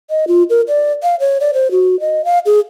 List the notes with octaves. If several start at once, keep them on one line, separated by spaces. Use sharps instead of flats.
D#5
F4
A#4
D5
F5
C#5
D5
C5
F#4
D#5
F5
G#4